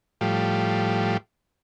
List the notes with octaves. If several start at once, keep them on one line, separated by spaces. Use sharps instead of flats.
A2 F3 G3